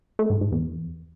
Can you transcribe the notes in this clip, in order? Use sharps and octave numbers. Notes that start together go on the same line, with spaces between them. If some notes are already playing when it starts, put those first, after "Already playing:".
A3
G#2
G#2
E2